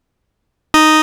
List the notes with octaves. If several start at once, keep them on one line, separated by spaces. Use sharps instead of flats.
D#4 D#5